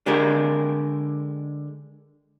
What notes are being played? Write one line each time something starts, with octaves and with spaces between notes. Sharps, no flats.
D3 G#3 G4 A#4